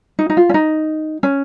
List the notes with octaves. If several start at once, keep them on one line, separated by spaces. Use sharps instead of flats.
D#4
D#4
F4
C#4
D#4
C#4